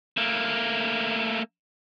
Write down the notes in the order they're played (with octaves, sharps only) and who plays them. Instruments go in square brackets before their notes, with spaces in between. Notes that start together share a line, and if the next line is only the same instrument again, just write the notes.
[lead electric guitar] A3 A#3